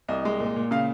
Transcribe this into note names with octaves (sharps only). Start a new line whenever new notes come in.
C2 D#5
G#3
A#2
A#2
C#3 F5